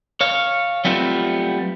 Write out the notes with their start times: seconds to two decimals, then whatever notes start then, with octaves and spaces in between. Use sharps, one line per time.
0.21 C#5 F5
0.85 F#3 G3 A3 B3 C4 F4